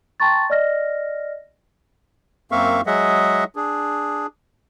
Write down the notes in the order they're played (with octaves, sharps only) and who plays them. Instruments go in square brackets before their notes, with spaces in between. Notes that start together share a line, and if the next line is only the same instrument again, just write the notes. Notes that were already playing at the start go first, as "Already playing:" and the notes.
[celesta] G5 A5 A#5 C6 C#6 A6
D5 D#5 F6 A#6
[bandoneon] F#2 A#3 C4 E5 F5 C#6
F#3 G#3 G#4 D#5 E5 F#5
D4 G#4